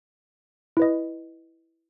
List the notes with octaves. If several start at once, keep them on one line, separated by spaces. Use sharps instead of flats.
E4 B4 D#5